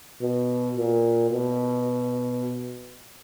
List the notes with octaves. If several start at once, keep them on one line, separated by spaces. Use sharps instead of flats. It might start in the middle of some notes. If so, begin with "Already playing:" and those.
B2
A#2
B2